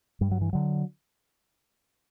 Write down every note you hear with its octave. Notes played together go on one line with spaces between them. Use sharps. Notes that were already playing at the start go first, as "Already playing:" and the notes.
G2 G3
F#3
E3
D3 F#3